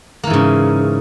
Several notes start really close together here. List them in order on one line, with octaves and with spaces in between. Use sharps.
A#3 E3 G#2 C#3